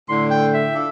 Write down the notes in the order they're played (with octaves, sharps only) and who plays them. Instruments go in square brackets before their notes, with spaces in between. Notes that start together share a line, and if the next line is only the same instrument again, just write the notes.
[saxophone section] A2 D3 [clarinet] C6
[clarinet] G5
E5
[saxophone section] D4 F4 A4